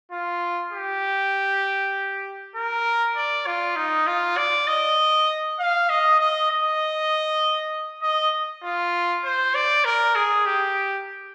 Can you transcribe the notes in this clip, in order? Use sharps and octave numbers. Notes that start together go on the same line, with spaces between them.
F4
G4
A#4
D5
F4
D#4
F4
D5
D#5
F5
D#5
D#5
D#5
D#5
F4
C5
D5
A#4
G#4
G4